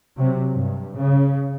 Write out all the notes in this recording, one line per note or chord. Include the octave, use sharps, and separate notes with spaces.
C3 F#3
G2
C#3